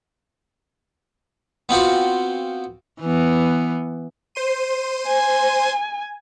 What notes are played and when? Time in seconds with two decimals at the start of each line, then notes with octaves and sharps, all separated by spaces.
1.69 B3 C4 F4 F#4
3.01 E3 B3
4.35 C5 C6 D#7
5.07 G#5